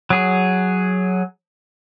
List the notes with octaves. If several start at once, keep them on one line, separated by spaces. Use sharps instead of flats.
F#3 G#4